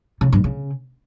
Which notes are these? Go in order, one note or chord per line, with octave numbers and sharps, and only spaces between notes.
C#3
G2
C#3